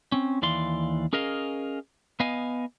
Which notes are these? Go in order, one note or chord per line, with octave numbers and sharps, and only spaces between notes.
C4 C#4
D#2 E3 D5 F5 C6
C#4 G#4 A#4 D#5 F5
B3 D#5 F5 G#5